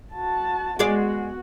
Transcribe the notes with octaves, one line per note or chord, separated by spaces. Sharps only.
F#4 A5
G#3 B3 F#4 G#4 D5